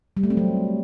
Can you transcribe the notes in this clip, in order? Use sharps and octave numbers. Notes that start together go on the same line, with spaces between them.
G3
A3
C4
F#3